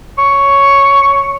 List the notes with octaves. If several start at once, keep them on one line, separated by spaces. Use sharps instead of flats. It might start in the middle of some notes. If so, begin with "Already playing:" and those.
C#5